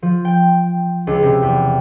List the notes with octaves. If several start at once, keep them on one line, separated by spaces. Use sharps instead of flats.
F3
G5
C#2
C3
E2